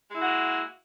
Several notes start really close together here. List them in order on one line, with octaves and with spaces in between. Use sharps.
G#3 E4 F#4 A#3